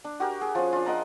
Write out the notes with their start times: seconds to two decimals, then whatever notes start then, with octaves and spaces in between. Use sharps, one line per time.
0.04 D4
0.20 F#4 G4 A#4
0.41 G#4
0.55 F3 C#4
0.73 D4 F4
0.86 A#4 D#5 F#5 A#5